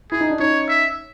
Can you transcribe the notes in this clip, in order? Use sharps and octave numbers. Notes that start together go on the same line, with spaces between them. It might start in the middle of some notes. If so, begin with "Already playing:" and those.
E4 G#4
D#4
D4
C#4 D#4 C#5
E5